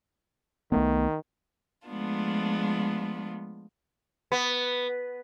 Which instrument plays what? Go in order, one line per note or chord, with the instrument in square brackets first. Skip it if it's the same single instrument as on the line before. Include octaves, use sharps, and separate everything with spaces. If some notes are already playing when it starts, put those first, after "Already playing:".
[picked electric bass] C2 A3 B3 [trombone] D#3
[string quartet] F3 G#3 A3 B3 D4 F4
[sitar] B3